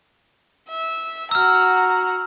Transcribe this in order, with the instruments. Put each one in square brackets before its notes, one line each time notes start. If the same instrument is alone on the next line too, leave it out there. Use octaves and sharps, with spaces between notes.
[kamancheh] E5
[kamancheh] F#4 A#5 [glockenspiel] E6 F6